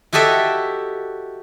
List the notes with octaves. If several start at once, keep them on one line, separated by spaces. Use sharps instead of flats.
E4 F#4 G4 A4 D#5 E5